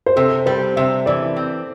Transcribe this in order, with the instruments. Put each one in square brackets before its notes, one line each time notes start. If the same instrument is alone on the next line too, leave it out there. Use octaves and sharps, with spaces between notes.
[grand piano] C5
[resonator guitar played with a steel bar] C3 [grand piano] A4
[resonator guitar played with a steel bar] G3 [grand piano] C5
[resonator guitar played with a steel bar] C3 [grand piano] E5
[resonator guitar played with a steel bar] E3 [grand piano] D5
[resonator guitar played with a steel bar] C4